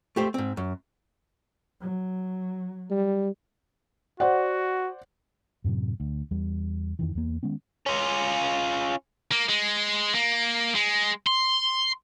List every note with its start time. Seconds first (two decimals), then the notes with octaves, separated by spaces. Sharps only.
0.16 A3 G4 C5
0.34 G#2 C4
0.57 F#2
1.80 F#3
2.91 G3
4.20 F#4 C5 D5 F#5
5.64 F#2 A2 C3 F#3
6.00 D2
6.31 E2 G3
6.99 F2 D#3 E3
7.15 E2 A#3
7.43 D#3 G#3 B3 C#4
7.86 C#4 F4
9.32 A#3
9.49 G#3
10.15 A#3
10.75 G#3
11.27 C6